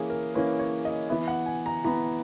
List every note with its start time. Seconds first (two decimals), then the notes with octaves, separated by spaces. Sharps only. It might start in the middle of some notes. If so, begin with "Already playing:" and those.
Already playing: E3 A#3 C#4 G#4
0.10 A#4
0.34 E3 A#3 C#4 B4
0.59 C#5
0.85 D#5
1.09 E3 B3 E5
1.28 F#5
1.46 G#5
1.66 A#5
1.85 E3 B3 A#5